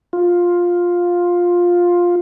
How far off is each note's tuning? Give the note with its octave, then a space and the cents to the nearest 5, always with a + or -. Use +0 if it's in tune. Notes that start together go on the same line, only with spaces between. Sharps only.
F4 +10